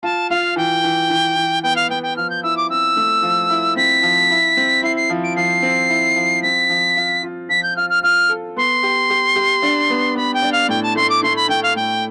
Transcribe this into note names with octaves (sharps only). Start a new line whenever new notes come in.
F4 A5
F4 F5
E3 G5
E3
E3
E3
B3 G5
F5
B3 G5
G5
F3 F6
G6
E4 E6
D6
C4 E6
A3
F3
E4
C4 B6
F3
E4
C4
E4 C7
C7
F3
D7
F3 C7
C4
E4
F3
C4 B6
F3
F4
F4
F3 B6
G6
F4 F6
F6
F4 F6
A4
B3 C6
G4
G4
G4
D4
B3
B3 B5
G5
D4
F5
A2 G5
A5
A3 C6
D6
A3 C6
B5
A3 G5
F5
A2 G5